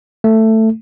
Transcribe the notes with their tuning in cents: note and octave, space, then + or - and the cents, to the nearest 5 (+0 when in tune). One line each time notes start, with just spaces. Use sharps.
A3 +10